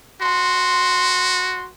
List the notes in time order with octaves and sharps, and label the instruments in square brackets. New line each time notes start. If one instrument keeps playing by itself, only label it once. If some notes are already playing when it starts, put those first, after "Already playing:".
[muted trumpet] F#4 [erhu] C6